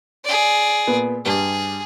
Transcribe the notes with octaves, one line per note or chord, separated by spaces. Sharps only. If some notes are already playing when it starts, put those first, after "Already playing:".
G#4 D5
A#2 B3
G2 G3 G#4